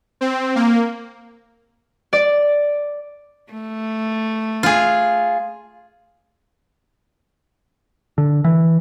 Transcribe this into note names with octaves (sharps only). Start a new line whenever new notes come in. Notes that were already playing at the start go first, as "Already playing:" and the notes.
C4
A#3
D5
A3
F4 G#4
D3
E3